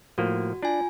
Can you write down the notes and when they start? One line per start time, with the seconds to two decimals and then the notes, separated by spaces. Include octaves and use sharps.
0.18 A2 F3 A#3 F#4
0.63 D4 F4 G#5